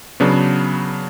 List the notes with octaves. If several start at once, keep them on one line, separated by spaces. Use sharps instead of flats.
C#3 F#3 B3 D4